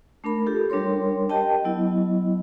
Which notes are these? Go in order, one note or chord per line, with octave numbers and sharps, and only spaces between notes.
A3 D4 A#4 B5
F4 G4 A4
G3 D4 A#4 C#5 C6
G4 A#4 D#5 G5 A5
F#3 B3 E4 D#5